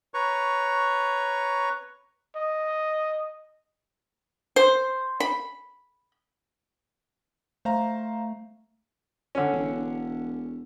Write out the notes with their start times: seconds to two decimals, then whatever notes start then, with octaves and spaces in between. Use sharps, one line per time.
0.14 B4 C#5 A#5 C#6
2.36 D#5
4.56 C5
5.20 B5
7.65 A3 C5 F5 A#5
9.35 D3 C#4
9.52 E1